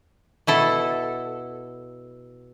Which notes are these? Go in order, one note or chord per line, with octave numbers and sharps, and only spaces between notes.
B2 E4 A4